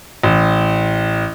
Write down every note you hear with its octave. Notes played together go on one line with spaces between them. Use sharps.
A1